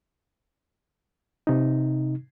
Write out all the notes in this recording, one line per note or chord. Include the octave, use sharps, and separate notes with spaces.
C3 D#4